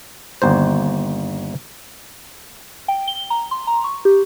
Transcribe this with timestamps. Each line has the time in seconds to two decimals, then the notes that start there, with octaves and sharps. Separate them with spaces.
0.42 G1 D#2 C5
2.88 G5
3.08 G7
3.30 A#5
3.51 C6
3.67 A#5
3.84 C#6
4.05 G4